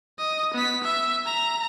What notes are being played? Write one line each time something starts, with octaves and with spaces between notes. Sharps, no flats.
D#5
B3 B6
E5
A#5